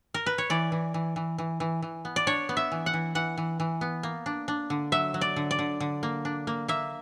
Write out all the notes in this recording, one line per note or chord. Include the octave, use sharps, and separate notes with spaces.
A#4
B4
C#5
E3 D5
E3
E3
E3
E3
E3
E3
B3
D5
D4 C#5
B3
E5
E3
F#5
E3
E3 F#5
E3
E3
B3
A#3
D4
D4
D3
F#3 E5
F#3
D5
D3
D5
D3
D3
A#3
D4
A#3
A#3 E5